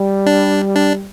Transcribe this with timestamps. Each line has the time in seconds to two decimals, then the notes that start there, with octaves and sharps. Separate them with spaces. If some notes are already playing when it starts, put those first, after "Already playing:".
Already playing: G3
0.26 D4
0.75 D4